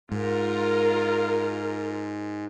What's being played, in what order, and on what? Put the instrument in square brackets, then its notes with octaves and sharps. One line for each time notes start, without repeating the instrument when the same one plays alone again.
[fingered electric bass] G#2 [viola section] F4 A#4